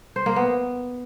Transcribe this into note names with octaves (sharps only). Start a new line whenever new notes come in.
C5
A#3
B3